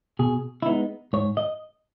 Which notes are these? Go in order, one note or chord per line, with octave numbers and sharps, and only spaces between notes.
B2 G#4
E4
G#3 B3 D#4
G#2 C#5
D#5